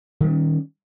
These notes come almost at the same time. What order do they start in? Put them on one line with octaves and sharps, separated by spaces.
D#3 G3 C#4